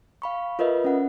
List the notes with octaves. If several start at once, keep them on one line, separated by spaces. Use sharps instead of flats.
F5 B5 C#6
F4 A#4 B4 D#5 E5
C#4 F#5